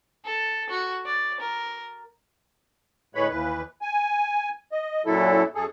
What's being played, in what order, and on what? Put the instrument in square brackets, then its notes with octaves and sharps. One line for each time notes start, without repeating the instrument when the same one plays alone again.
[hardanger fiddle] A4
F#4
D5
A#4
[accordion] A2 D3 G#3 B4 C#5 B5
D#2 E3 B4
G#5
D#5
F#2 A#2 F#3 E4 A4
F#2 G#4 A4